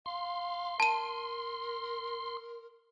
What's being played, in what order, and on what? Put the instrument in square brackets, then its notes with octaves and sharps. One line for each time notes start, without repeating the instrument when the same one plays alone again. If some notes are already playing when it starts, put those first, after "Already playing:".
[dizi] F5 [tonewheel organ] C6
[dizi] A#4 [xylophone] A5 D#7